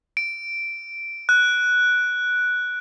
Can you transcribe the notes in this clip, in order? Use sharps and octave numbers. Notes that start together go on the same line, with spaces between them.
D7
F#6